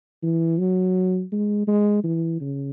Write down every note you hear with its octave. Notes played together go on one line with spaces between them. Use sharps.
E3
F#3
G#3
G#3
E3
C#3